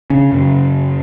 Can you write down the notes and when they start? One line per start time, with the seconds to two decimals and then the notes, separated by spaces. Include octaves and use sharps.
0.10 C#3 C#4
0.31 F#2 C#3